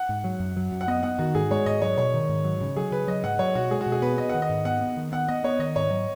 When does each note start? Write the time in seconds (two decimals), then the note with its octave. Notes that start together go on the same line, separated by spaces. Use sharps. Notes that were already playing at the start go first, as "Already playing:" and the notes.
Already playing: F#5
0.09 G#2
0.24 F#3
0.40 F#2
0.57 F#3
0.72 F#2
0.81 F#5
0.88 B3 D#5
1.03 B3 F#5
1.19 D#3 F#4
1.35 G#2 G#4
1.51 G#3 C#5
1.66 G#2 D#5
1.82 F#3 C#5
1.97 B2 C#5
2.14 D#3
2.29 G#2
2.44 F#3
2.61 C#3
2.76 F#3 G#4
2.92 C#3 B4
3.07 F#3 D#5
3.24 G#2 F#5
3.39 F#3 C#5
3.55 B2 F#4
3.71 G#3 G#4
3.81 F#4
3.86 B2
3.92 G#4
4.02 B3 B4
4.18 B3 D#5
4.30 D#3 F#5
4.42 D#5
4.49 G#2
4.65 B3 F#5
4.81 B3
4.97 D#3
5.12 B3 F#5
5.28 B3 D#5
5.44 B3 C#5
5.59 D#3 D#5
5.76 G#2 C#5
5.91 F#3